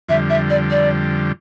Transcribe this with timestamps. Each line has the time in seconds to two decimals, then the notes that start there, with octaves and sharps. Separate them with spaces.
0.08 F2 D3 G3 E5
0.30 E5
0.50 D5
0.71 D5